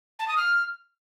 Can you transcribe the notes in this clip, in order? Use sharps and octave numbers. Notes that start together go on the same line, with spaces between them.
A5
D#6
F6